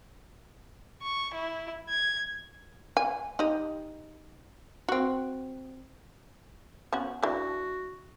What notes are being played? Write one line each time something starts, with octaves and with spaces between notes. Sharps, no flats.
C#6
E4
G#6
G#5
D#4 G4 D#5
C4 F#4
B3 C#4 F#4
E3 D4 F#4